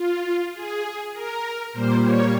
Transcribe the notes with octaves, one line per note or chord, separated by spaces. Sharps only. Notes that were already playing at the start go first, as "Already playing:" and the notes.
Already playing: F4
G#4
A#4
A#2 G3 A#3 C5
C#5